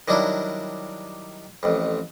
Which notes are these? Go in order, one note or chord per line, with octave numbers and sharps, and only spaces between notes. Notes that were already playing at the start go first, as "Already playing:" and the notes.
D#3 F#3 G3 D4 E4
A1 F2